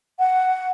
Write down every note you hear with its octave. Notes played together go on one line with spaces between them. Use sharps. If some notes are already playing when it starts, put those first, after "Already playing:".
F#5